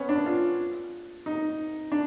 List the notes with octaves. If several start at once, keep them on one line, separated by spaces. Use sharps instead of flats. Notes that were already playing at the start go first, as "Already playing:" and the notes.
Already playing: B3 C#4
D4
F4
D#4
D4